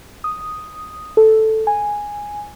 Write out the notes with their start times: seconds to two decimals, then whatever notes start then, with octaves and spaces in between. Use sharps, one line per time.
0.24 D#6
1.17 A4
1.67 G#5